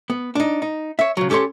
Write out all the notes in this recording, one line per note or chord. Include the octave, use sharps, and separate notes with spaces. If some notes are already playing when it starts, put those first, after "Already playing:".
B3
D4 D#4
D#4
C#5 E5
C#3 F#3
C#4 G4 A4 C#5 C6